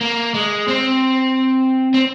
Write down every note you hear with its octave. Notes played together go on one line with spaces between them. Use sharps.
A#3
G#3
C4
C4